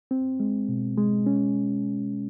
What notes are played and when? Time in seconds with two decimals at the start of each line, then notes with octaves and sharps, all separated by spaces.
0.11 C4
0.40 G#3
0.69 B2
0.98 G#3
1.26 C#4